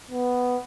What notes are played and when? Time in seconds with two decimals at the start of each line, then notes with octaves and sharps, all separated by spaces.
0.11 B3